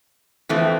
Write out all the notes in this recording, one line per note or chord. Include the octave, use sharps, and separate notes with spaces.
F2 E3 A3 C4